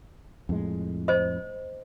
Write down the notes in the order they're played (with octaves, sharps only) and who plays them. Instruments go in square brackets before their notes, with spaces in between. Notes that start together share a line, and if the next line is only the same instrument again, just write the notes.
[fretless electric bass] F2 A2 G#3
[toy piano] C5 D#5